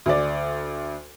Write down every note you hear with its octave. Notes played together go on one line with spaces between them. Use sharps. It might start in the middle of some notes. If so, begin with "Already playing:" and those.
D2 D5